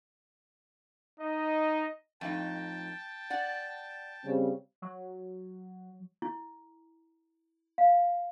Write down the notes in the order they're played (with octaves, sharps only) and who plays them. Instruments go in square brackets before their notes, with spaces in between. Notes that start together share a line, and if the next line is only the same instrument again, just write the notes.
[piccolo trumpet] D#4 [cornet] D#5
[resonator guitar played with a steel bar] F2 A2 D#4 [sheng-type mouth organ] G5 A5
[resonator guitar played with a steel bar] D5 F#5
[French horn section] C#3 G3 C4
[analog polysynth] F#3
[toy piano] E4
F5